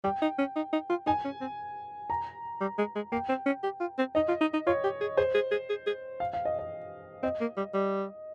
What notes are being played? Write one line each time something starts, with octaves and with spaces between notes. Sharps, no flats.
G3 G5
D#4
C#4
D#4
D#4
F4
D#4 G#5
C#4
C4
A#5
G3
G#3
G#3
A#3 G5
C4
C#4
G4
F4
C4
D#4 D#5
F4
D#4
D#4
F4 C#5
G4
G#4
G#4 C5
G#4
G#4
G#4
G#4
F5
F5
D#5
D#5
C4 D#5
A#3
G3
G3